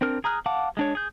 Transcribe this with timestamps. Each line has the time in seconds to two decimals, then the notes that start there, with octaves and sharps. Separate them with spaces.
0.01 C4 D4 A#4 F6
0.24 G#4 A#5 D#6 F6 F#6
0.46 F5 F#5 A5 D6
0.77 G#3 D4 C#5
0.95 G#4 G6